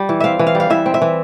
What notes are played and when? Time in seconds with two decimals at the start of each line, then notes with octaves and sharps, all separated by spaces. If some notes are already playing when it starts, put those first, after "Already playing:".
Already playing: G3
0.09 E3
0.20 C4 E5 F5
0.39 E3
0.47 F5
0.55 G3
0.60 F5
0.70 E3 E5
0.86 C4
0.94 E5
1.02 E3